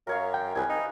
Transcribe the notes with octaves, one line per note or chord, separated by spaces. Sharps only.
F#2 A#4 C#5 F5
G5
C2 B4 G#5
D#4